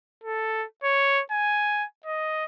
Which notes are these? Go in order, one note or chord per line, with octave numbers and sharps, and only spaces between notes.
A4
C#5
G#5
D#5